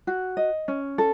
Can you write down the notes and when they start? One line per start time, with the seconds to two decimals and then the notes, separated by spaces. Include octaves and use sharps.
0.07 F#4
0.37 D#5
0.68 C#4
0.98 A4